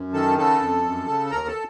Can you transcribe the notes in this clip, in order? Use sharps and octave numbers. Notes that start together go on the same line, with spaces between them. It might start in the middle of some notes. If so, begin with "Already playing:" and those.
Already playing: F#2
D#3 A4 A5
C#3 A4 A5
F2
F#2
C#3
A5
D#2 A#4 A#5
A4 A5